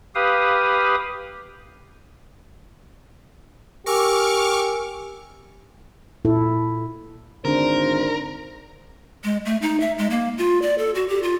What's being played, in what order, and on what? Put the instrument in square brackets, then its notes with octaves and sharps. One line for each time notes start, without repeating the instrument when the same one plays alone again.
[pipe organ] G4 B4 F5 D#6
[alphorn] G4 [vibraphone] A#4 G#5 E6 [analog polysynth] C#6 D6 F6
[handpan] A#2 E4 A4
[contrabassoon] G#1 [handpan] D3 D4 [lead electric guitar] A#4 [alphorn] C5
[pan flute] G#3
A3
D#4
E5
G#3
A#3
F4
D5
A4
F#4
G4
F4